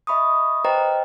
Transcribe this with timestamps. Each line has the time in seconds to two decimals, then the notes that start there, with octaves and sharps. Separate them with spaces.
0.07 D#5 E5 B5 C#6 D#6
0.65 B4 C5 D#5 G5 A#5